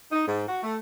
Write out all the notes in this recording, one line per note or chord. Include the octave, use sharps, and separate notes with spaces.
D#4
G#2
F#4
A3